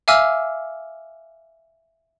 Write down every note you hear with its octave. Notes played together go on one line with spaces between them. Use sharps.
E5 F5 G#5 D6 E6 F6